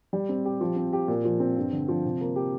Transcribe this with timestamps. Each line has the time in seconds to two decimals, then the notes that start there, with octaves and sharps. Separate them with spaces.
0.13 G3
0.29 C4
0.45 G4
0.61 F3
0.76 C4
0.93 G4
1.08 A#2
1.25 F3
1.40 C4
1.57 G2
1.72 D3
1.88 F3
2.05 C3
2.21 A#3
2.36 G4